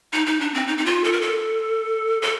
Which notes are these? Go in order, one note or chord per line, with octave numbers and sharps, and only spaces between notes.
D#4
D#4
D4
C4
D#4
D#4
F4
A4
A#4
A4
A4